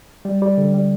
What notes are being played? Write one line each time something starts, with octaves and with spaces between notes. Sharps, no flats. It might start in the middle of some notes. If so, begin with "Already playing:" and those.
G3
G3
D3
G3